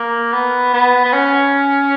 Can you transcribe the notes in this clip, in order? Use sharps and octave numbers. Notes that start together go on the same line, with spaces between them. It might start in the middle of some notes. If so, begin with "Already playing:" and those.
Already playing: A#3
B3
B3
B3
C#4